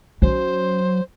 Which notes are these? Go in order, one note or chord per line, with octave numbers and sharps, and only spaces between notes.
F#3 C#4 D#4 C5